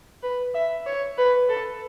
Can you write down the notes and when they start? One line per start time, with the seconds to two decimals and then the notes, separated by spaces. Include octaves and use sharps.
0.23 B4
0.55 E5
0.86 C#5
1.18 B4
1.49 A4